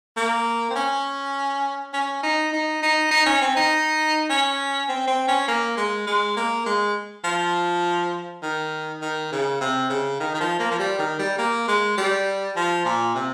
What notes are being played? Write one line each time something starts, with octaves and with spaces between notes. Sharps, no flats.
A#3
C4
C#4
C#4
D#4
D#4
D#4
D#4
C#4
C4
D#4
C#4
C4
C4
C#4
A#3
G#3
G#3
A#3
G#3
F3
D#3
D#3
C#3
C3
C#3
D#3
D#3
F3
A#3
F3
G3
D#3
G3
A#3
G#3
G3
F3
A#2
C3